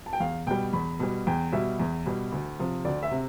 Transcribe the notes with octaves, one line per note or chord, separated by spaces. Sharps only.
A5
G5
E2 F5
B2 G3 G5
E2 B5
B2 G3
E2 G5
B2 G3 E5
E2
B2 G3
D2
C3 F3
D2 D5
E5
C3